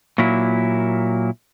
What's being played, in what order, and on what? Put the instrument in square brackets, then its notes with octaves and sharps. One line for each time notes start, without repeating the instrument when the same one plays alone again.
[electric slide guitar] A#2 F#3 A#3 E4